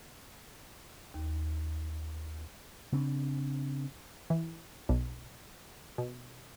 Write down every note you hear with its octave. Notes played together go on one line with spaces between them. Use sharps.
D#2
C#3 C4 D4
E3
B1
B2